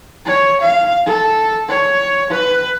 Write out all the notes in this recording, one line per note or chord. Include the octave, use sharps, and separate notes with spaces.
C#5
F5
A4
C#5
B4